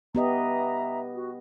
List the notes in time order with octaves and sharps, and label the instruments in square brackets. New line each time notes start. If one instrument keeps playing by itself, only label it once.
[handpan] B3 G4 D#5 [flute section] E5 A#5
[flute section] F#4